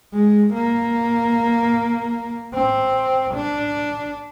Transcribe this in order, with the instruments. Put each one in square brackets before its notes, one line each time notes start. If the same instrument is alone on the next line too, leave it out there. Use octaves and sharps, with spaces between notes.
[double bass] G#3
A#3
C4
D4